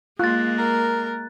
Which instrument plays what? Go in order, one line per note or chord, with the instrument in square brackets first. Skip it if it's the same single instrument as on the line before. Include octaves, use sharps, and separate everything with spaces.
[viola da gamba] G#3 A#3 [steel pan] F4 [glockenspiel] F#6 A6
[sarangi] A#4